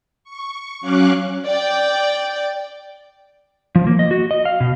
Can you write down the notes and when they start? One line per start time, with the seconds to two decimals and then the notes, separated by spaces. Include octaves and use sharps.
0.24 C#6
0.81 F#3 C#4 F5 C#6 D6 F#6
1.45 D5 G5
3.76 F3
3.87 A#3
3.99 D#5
4.11 F#4
4.31 D#5
4.45 F5
4.60 B2